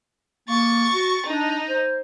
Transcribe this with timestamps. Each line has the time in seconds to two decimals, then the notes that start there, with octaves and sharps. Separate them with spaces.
0.48 A#3 C#6 A6
0.93 F#4
1.26 D4 D#4
1.69 C5